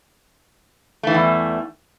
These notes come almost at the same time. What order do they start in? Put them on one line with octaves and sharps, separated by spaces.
A3 E3 G3 E2